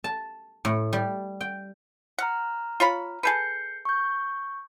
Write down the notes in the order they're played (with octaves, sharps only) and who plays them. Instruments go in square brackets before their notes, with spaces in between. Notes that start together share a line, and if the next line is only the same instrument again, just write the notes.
[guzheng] A5
A2
G3
G5
[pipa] F#5 [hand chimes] A#5 F6 F#6
[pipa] F4 C#5 B5
[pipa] G#4 A4 B4 [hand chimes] G6 C7 C#7
[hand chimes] C#6 G6